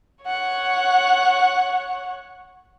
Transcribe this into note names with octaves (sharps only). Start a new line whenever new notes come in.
C#5 F#5